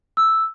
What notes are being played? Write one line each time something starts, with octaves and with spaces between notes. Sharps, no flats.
E6